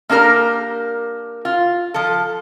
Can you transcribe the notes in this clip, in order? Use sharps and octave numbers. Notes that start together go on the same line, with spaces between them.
A#3 D4 G4 A#4 A#5
F4
F3 A4